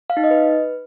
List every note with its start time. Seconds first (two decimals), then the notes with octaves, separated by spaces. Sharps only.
0.10 F5
0.17 D#4
0.24 D#5
0.31 B4